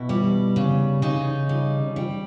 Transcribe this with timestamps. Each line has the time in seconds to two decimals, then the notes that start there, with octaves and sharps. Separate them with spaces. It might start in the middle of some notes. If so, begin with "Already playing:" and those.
Already playing: B2 E4
0.09 G3
0.56 C#3
1.02 C#3 D#4
1.49 G3
1.96 G3